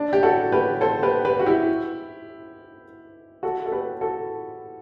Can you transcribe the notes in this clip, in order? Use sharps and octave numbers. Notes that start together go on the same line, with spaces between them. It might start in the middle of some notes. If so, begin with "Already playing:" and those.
Already playing: D4
G4
F#4 A4
G4 B4
A4 C5
G4 B4
G4 B4
F#4
E4 G4
F#4 A4
A4
G4 B4
F#4 A4